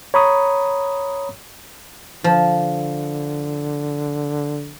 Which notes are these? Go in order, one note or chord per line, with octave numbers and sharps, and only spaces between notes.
C#5 A#5 B5 C#6 D#6
D3 F3